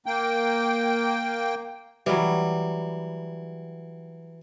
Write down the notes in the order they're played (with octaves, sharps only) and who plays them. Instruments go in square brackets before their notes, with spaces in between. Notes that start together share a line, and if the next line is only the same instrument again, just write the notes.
[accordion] A#3 G5
[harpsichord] E3 [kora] F#3 G3